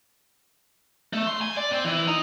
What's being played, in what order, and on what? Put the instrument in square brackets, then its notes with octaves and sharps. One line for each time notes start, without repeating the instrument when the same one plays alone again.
[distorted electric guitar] A3
C6
G#5
D5
C4
E3
D#4